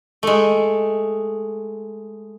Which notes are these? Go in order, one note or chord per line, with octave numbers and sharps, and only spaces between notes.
G#3 A3